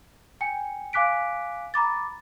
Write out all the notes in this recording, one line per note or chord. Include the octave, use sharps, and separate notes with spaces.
G5 G#5 C#7
F5 G#5 D6 F#6 B6 D7
A#5 B5 D6 A6